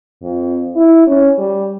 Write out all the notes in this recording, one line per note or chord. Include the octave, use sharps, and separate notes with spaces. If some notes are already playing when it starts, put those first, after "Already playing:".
F2
E4
C#4
G3